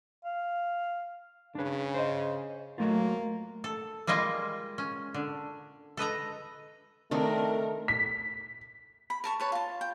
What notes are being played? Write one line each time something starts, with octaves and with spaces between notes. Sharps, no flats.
F5
C#3 D4 B4
C5 D#5
F#3 A3 A#3 F4
A4
G3 G#3 A#3 F4 D#5
C#4
D3
A4 B4 D#5 A#5
D#3 A3 C4 D4 A#4
B6
B5
A#4 A5 C#6
B4 C#5 A5
F4 A5
G5